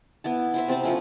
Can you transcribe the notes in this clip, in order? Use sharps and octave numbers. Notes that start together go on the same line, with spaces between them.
B3 E4 A5
E4 C5 E5
C3 C4 C5 A5
F3 A3 C#4